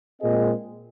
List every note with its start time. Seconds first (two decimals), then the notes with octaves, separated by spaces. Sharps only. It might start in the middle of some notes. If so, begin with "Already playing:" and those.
0.21 A#2 G#3 C4 G#4 D#5